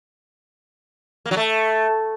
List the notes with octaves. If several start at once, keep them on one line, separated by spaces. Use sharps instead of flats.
A#3
F#3
A3